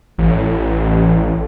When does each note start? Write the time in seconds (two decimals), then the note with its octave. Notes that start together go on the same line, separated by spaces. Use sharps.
0.18 A1